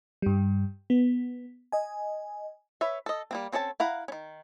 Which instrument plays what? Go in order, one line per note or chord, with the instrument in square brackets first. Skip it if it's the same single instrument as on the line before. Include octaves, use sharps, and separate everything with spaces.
[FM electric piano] G2 G3
B3
D#5 G#5
[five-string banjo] B4 C#5 E5
A4 D#5
G3 A#3 C4
C4 C#4 A4 D#5 A5
E4 F5 F#5 A#5
D#3 C#4